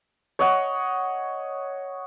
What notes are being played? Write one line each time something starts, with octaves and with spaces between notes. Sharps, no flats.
C#5 D#5 F#5